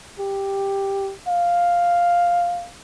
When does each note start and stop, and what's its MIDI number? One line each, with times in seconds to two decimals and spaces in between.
0.20 1.13 67
1.28 2.69 77